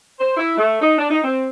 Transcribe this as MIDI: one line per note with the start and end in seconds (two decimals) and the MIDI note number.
0.19 0.33 72
0.37 0.53 64
0.57 0.80 57
0.81 0.95 63
0.98 1.06 62
1.11 1.19 63
1.24 1.48 60